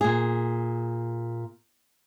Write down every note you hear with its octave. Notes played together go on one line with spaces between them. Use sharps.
A#2 G#4